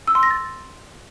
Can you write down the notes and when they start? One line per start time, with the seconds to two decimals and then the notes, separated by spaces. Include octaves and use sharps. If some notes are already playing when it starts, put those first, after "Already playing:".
0.07 E6
0.15 C6
0.23 A#6
0.31 A6